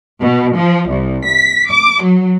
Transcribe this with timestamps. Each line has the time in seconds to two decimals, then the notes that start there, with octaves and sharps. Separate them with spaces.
0.22 B2
0.57 F3
0.89 C2
1.27 B6
1.70 D6
2.03 F#3